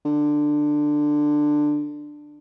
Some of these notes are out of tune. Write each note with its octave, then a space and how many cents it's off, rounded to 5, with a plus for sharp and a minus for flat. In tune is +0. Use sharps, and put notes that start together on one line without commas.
D3 +15